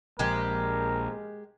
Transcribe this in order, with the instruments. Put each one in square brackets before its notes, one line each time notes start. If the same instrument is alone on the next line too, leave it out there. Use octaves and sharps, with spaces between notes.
[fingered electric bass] A#1 [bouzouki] G#3 G4 [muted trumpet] A#4